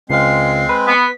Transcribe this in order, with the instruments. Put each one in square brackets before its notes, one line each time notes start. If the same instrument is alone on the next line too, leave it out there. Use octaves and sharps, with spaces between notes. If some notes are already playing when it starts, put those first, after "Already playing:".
[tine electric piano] C#2 F5 [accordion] G#3 C4 [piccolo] C7
[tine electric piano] B4
[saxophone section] B3 [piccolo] B6